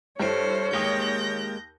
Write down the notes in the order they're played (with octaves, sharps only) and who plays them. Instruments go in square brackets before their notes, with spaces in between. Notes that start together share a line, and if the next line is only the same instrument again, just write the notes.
[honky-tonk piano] G2 E4 D7 [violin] A4 C5 [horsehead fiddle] C#5
[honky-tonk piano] D#2 D#6 C#7 [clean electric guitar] G#3 A#3 G4 [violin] G6 A#6